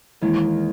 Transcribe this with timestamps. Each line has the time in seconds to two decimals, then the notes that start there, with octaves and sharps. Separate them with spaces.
0.21 D#2 D#3 E3 G#3